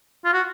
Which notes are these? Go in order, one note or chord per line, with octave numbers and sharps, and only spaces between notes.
F4
F#4